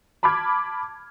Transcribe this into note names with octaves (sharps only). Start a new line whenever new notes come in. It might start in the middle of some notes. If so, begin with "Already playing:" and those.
A5 B5 D6 F6 G#6